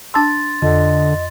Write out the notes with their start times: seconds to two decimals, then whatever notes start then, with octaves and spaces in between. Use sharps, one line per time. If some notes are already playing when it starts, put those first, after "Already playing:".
0.14 D4 A5 C6 E6 A6
0.62 F2 D3 D#5